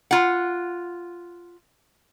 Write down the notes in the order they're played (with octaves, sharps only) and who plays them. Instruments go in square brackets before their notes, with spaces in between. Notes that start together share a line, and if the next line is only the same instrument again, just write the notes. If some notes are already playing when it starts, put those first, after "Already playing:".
[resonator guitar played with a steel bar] F4 F#5